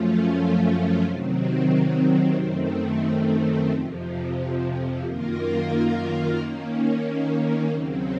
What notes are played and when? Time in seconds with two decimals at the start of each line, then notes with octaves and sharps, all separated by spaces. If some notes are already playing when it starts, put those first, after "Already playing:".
Already playing: F#2 F3 A3 C#4 F4
1.04 C3 D#3 F#3 C4
2.37 F#2 D#3 A3 C4
3.70 F2 C3 F3
5.03 F#2 D#3 A#3 F4 A#4
6.37 D#3 A#3 C#4
7.69 D#2 C#3 F#3 C4